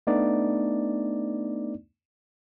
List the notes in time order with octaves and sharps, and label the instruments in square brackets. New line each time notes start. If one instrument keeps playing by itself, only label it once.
[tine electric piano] A3 B3 D4 D#4 D5